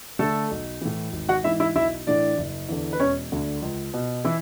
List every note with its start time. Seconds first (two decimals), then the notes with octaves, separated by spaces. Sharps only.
0.19 D3 A3 A4
0.51 B1
0.81 A2 E3
1.13 G#1
1.29 F#4 F#5
1.44 G#2 E3 E4 E5
1.60 E4 E5
1.75 B1 E4 E5
2.07 A2 E3 D4 D5
2.38 F#1
2.69 E2 D3
2.93 B4
3.00 E1 C#4 C#5
3.32 D2 D3
3.62 C#2
3.94 B2
4.25 E3 E4